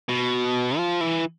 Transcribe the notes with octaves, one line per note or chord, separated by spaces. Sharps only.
B2
F3
E3